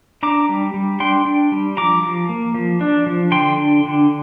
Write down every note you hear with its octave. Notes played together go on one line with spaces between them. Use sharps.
D4 A#5 D6
G3
G3
D4 G5 C6
D4
G3
F3 A#5 D6
F3
A#3
F3
D4
F3
D3 G5 C6
D4
D3